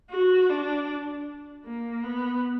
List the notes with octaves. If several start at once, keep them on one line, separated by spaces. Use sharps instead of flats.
F#4
D4
A#3
B3